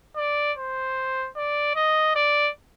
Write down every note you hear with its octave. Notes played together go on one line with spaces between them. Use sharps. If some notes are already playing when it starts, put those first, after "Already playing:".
D5
C5
D5
D#5
D5